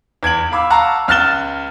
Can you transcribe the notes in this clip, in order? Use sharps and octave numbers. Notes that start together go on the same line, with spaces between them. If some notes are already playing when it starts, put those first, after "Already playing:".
E2 G#6 D7 F#7
F5 B5 D6 E6
F5 F#5 A5 A#5 C#6 E6
C#2 F6 F#6 A6 E7 G7